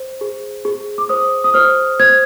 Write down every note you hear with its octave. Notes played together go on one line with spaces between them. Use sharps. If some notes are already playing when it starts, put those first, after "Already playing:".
Already playing: C5
G#4
G#4
D6
C5 D#6
D#6
C5 F6
C5 G#6